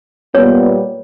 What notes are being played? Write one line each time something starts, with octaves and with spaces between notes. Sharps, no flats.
A#2 G3 B3 C#5